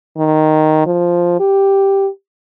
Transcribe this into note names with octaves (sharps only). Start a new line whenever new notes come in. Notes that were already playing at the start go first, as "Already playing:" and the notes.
D#3
F3
G4